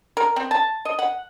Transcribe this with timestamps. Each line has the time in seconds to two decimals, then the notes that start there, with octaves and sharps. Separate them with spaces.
0.17 A#4
0.36 C4
0.51 A5
0.85 D#5
0.99 F#5